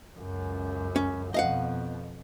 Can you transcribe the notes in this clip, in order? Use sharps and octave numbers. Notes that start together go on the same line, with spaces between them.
C#2 F#2
C#4
F2 B2 D#5 F5 F#5